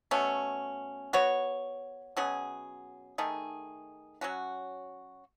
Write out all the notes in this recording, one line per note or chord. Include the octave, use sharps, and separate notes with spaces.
B2 A3 C#4
B3 F#4 C#5
B2 F#3 C#4 G#4
D#3 A3 D#4 G#4
F#3 C#4 F#4